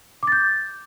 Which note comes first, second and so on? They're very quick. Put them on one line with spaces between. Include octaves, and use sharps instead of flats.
D6 A6 G6